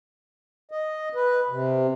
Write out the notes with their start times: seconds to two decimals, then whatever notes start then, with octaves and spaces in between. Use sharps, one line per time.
0.71 D#5
1.15 B4
1.50 C3